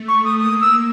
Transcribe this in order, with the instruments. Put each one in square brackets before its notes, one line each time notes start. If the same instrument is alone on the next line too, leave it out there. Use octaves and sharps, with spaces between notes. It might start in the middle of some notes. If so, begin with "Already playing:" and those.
Already playing: [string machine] A3
[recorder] C#6
D#6
[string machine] A#3 [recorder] D#6
[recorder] E6